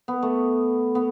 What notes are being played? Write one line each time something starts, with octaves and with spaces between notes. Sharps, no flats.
B3
A3
B3